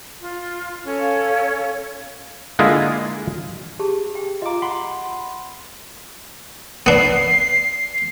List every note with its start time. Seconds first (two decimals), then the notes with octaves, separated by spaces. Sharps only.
0.21 F4
0.84 C#4 A4 C#5
0.99 F5
2.59 D3 G#3 A#3 E4 F4 G#4
3.80 G4 G#4 A5
4.15 G5
4.42 F4 D#5 A#5 D6
4.62 F#5 B5 C6
6.86 B3 D4 C7